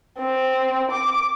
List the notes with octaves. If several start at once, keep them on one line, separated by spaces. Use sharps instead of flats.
C4
D6